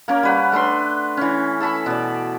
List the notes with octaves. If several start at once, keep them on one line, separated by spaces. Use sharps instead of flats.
A#3 C#4 A#4
G3 B4 F#5
A3 D4 B4 C6
E3 C#4
A4 A5 B5 C#6
B2 D5